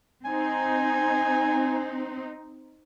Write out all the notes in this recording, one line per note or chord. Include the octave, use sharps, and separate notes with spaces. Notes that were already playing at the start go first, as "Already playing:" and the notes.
C4 D#4 G#5